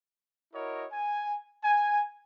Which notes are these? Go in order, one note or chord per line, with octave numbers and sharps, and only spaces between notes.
E4 F#4 A#4 C#5 D#5
G#5
G#5